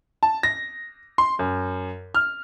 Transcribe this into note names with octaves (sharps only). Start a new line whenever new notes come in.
A5
A#6
C6
F#2
F6